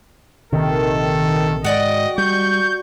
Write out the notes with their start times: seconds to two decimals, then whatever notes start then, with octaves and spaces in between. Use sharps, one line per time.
0.53 A#1 C3 D#3 A4
1.64 G#2 F#4 D5 D#5 G5
2.18 G3 C#6 G6